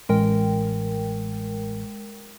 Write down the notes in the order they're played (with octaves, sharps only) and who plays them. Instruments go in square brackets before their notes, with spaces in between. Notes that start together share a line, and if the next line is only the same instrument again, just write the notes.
[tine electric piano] A1 [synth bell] G#3 A#4 G5